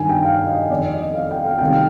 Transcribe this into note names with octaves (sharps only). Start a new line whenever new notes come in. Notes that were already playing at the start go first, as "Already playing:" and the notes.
Already playing: G2 D#3 G#5
G5
F5
D#5
F2 D#3 D5
D#5
F5
G5
F5
C2 C3 D#3 G5
F5